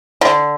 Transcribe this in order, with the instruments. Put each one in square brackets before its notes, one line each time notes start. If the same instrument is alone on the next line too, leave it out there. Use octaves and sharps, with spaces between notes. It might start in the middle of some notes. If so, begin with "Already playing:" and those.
[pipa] D3